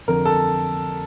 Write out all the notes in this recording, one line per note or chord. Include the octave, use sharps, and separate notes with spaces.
F2 D3 A#4
A4